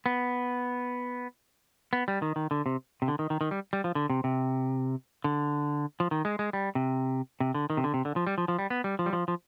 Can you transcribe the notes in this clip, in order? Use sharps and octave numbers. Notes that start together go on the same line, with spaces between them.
B3
B3
G3
D#3
D#3
D3
C3
C3
D3
D#3
D#3
D#3
G3
G3
F3
D3
C3
C3
D3
F3
D#3
G#3
G#3
G3
C3
C3
D3
D#3
C3
D3
C3
D3
F3
G3
F3
F3
G3
B3
G3
F3
G3
F3
F3